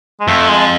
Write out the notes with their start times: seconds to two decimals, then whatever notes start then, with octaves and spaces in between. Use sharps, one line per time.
0.20 G#3
0.27 F2 A3
0.49 G#3